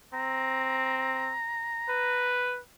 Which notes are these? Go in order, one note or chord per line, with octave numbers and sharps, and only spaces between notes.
C4 A#5
B4